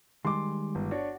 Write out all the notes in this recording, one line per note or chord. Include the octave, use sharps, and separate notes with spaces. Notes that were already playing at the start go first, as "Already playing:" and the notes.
D#3 G3 G#3 C6 D6
G1
D4 F#4 C#5